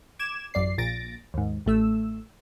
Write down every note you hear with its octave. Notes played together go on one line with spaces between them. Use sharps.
D6 G#6 E7
A1 F#2 D5 C7
A#1 A#2 A6 A#6 D7
D#2 G#2
A1 A3 E6